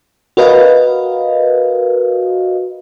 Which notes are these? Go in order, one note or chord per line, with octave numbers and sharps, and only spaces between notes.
F#4 A#4 B4 D#5 F5